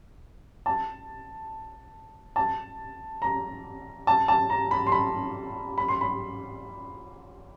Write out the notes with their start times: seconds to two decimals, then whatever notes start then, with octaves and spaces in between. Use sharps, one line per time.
0.66 A5
2.36 A5
3.22 A#5
4.07 A5
4.28 A5
4.50 A#5
4.71 B5
4.87 C6
4.92 B5
5.78 B5
5.88 C6
6.01 B5